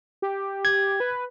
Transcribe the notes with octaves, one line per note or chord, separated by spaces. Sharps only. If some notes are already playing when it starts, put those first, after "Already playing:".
G4
G#6
B4